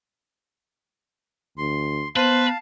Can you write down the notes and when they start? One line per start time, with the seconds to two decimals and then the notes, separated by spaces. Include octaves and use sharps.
1.58 D2 C6
2.16 B3 B4 C5 F5 A5